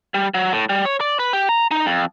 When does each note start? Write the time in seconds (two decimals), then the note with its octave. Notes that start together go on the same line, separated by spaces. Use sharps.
0.14 G3
0.34 F#3
0.52 A2
0.69 G3
0.85 C#5
1.01 D5
1.19 B4
1.33 G4
1.49 A#5
1.71 D#4
1.86 F2